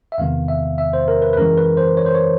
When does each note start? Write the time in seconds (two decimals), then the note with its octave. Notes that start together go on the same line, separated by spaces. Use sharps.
0.12 E5
0.18 E2 C3 D#3 G#3 B3 F5
0.48 E5
0.78 E5
0.93 C5
1.08 A#4
1.22 B4
1.33 B4
1.37 F#2 C#3 E3 G#3 A#4
1.58 B4
1.77 C5
1.97 C#5
2.06 C5
2.15 C#5